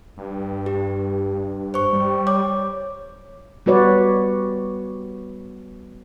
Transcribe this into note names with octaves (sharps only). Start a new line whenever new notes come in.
G2
G4
C5 C#6
G3
C#5 D6
G3 B3 F#4 B4 C#5 D5